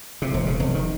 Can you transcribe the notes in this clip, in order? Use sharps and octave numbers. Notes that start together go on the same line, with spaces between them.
C3
E1
C#3
F1
D#3